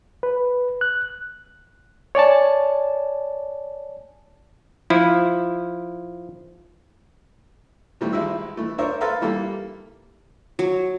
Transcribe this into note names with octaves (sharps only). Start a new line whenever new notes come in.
B4
F#6
C#5 D5 G#5 A5
F3 E4
C3 E3 F3 G3 A3
G#1 G#3 D#4 E4 E6
E3 A3
D4 A#4 C5 C#5 E5
A4 B4 E5 F5 A#5 C6
E3 G3 A#3 A4
F#3